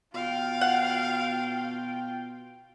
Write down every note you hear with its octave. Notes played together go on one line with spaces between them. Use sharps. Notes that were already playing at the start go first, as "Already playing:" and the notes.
B2 F4 F5 G5
F#5